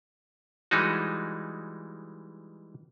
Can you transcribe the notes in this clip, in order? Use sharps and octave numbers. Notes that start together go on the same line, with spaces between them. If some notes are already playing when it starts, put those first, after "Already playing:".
E3 G3 G#3 D#4 F#4